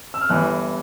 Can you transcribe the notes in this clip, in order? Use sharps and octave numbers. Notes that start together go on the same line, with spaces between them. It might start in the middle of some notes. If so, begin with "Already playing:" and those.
E6
F6
G1 G2 E3 F#6